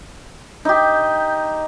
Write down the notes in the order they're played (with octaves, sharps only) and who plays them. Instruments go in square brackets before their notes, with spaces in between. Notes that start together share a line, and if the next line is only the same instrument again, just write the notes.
[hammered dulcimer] D#4 G4